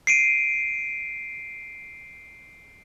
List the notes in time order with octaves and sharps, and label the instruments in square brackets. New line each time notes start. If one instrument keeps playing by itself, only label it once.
[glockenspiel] C7 D7 D#7